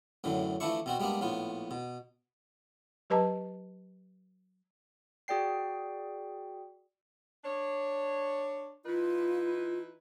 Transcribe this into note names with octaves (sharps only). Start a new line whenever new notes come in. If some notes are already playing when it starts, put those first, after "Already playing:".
F#2 A2 D3 E3
E3 F3 A3 D4 E4 C#6
B2 C4 F#4
G3 G#3 A#3 B3 D4
A#1 A2 B3 F4
B2
F#3 G4 B4 D#5 A5 A#5
F#4 G#4 D5 G5 C7
D4 C#5
E3 D#4 F4 B4